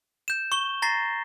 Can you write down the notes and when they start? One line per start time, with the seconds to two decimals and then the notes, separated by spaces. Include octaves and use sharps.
0.28 G6 E7
0.52 C#6 G7
0.82 A#5 A6 A#6 C7